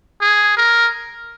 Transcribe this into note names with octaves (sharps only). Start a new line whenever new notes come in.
G#4
A#4